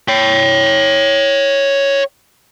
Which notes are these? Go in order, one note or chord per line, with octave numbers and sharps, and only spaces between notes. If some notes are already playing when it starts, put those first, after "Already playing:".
C#5 G5